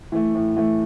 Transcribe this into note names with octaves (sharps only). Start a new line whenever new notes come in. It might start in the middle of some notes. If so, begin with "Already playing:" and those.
E3 A3
A2
E3 A3